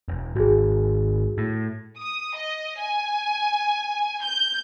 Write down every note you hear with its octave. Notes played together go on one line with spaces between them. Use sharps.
E1
G#1 F#4 G#4
A2
D#6
D#5
G#5
G6